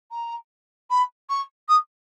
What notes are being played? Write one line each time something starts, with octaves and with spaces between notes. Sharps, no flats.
A#5
B5
C#6
D#6